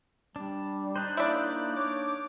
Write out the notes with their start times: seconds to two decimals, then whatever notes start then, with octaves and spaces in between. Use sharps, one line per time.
0.36 G3 D4
0.96 D4 D#4 C5 F#6
1.17 A#3 E4 D5
1.76 C#5 D6